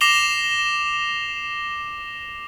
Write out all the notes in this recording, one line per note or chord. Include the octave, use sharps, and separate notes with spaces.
D6 A#6 C7 E7 F7 G7